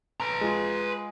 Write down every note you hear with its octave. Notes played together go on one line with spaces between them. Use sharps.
B4 A#5
G#3 F4